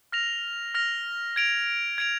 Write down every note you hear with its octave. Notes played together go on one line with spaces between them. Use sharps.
F6 A#6 F7
F6 A#6 F7
G#6 D7 F7
G#6 D7 F7